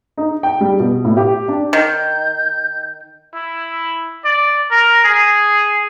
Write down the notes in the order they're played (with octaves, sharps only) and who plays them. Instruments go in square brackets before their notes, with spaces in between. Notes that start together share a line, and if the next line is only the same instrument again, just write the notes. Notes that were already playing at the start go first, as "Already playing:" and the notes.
[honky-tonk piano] D#4
G5
G3
B2
A2
G4
D4
[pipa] D#3 [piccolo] G6
[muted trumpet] E4
D5
A#4
G#4